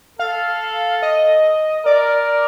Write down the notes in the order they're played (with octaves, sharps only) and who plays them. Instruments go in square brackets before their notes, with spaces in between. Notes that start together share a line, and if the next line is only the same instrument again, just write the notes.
[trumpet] A4 [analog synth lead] F5
[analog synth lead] D#5
[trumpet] A#4 [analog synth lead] D5